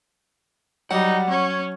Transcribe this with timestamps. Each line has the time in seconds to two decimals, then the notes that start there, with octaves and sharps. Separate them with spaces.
0.91 F#3 G3 D#4 F#5
1.30 C#4 C#5